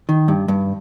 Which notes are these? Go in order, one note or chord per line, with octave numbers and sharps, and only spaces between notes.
D#3
G2
G2